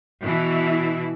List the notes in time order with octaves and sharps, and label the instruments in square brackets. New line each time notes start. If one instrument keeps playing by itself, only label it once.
[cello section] B2 E3 E4